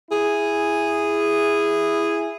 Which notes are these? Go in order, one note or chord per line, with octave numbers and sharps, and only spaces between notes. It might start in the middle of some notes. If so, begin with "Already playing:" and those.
E4 G#4